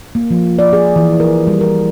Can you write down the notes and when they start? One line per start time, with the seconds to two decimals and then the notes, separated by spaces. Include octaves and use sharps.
0.15 A#3
0.31 F3
0.59 D5
0.73 G#4
0.96 E3
1.20 A#4
1.47 G3
1.61 A#4